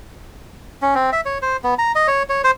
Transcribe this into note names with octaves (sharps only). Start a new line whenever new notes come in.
C#4
C4
E5
C#5
C5
B3
A#5
D#5
C#5
C#5
C5